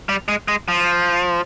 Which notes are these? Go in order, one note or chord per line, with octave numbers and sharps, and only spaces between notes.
G3
G#3
G#3
F3